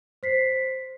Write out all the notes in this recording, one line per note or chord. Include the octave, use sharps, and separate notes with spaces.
C5 B6 C7